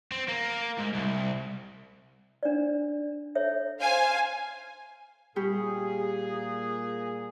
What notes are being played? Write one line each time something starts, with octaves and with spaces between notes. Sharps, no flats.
C4
A#3
G#2
C2
D4 D5
A4 C#5 E5
C5 F5 G#5
A#2 G3 G4 G#4 C#6